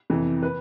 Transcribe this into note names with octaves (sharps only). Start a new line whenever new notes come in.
F2 C3 E3
B4